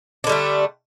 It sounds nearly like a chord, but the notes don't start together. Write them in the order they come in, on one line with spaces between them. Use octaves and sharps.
D4 D3 G3 A3